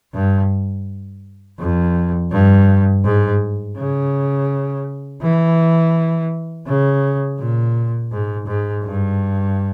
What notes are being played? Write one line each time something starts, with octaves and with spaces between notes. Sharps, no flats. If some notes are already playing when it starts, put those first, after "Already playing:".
G2
F2
G2
G#2
C#3
E3
C#3
A#2
G#2
G#2
G2